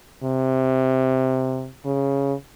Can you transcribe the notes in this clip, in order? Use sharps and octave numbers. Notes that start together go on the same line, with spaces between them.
C3
C#3